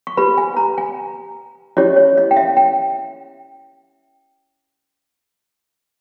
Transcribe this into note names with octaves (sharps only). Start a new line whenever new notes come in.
C#6
G4 B4 B5
G#5
A#5
G#5
C#4 E4 G4 C#5 D#5
C#5
D#5
G5
E5
G5